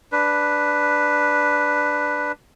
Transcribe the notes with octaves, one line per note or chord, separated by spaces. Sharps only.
D4 B4